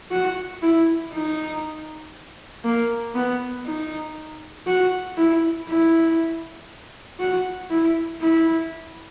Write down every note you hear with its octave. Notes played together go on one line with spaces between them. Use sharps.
F#4
E4
D#4
A#3
B3
D#4
F#4
E4
E4
F#4
E4
E4